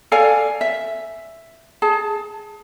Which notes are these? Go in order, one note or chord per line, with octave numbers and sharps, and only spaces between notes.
A4 D5 F5 G#5
E5
G#4 A5